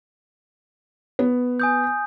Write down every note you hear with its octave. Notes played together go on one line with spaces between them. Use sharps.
B3
G#5 D#6 G6